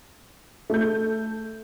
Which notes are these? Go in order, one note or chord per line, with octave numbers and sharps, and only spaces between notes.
A3 G6